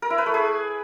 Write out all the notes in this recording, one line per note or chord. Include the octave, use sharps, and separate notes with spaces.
A#4
E4
B4
A3
G#4